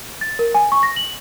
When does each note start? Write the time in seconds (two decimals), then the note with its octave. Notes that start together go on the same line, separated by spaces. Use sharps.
0.21 A6
0.39 A#4
0.55 G#5
0.72 C#6
0.83 A#6
0.96 F#7